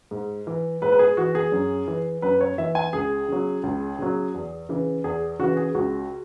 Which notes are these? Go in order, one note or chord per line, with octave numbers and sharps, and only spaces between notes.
G#2
E3
G#2 B4
B4
G#4
E3 F#4
G#4
F#2
E3
F#2 B4
C#5
E3 E5
G#5
C#2 G#4
C#3 F#3
C#2
C#3 F#3
E2
C#3 E3
E2 G#4
C#3 E3 F#4
G#4
C#2 F#4